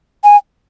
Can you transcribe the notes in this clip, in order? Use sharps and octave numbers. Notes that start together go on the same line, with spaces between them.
G#5